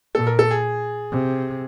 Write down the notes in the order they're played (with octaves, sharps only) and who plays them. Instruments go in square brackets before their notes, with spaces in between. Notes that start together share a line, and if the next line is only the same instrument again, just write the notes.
[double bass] A#2 [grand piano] A4
[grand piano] A#4
A4
G#4
[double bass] C3